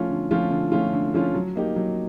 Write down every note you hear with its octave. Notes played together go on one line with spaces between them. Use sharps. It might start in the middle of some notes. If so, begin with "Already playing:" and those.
Already playing: F3 A3 C#4 F4
D3
F3 A3 C#4 F4
D3
F3 A3 C#4 F4
D3
F3 A3 C#4 F4
F#3
A#3 D#4 G4
F#3